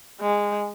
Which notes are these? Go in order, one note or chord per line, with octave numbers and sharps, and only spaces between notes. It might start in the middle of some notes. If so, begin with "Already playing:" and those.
G#3